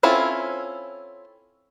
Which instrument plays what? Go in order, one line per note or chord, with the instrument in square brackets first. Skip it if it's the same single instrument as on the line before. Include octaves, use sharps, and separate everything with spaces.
[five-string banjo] C4 C#4 E4 F4 A4